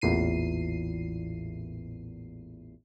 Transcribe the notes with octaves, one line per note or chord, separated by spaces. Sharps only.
A1 E2 A#2 C7 D#7